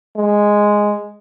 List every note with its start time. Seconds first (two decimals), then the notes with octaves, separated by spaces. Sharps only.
0.17 G#3